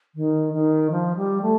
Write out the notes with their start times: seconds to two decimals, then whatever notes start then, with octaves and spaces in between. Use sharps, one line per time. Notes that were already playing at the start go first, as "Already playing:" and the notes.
0.15 D#3
0.53 D#3
0.91 F3
1.16 G3
1.42 A3